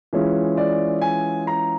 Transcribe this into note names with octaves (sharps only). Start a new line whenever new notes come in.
E3 G#3 C#4 F4
D5
G#5
A#5